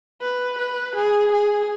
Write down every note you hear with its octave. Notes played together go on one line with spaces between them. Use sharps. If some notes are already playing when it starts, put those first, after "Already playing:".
B4
B4
G#4
G#4